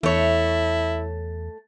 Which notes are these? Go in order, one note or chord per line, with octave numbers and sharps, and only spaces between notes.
E2 A3 E4 C#5